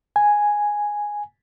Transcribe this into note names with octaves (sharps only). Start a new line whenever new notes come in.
G#5